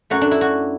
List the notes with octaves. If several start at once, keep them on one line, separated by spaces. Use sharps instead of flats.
F#2 F#3 A3 F#4
D4
E4
F#4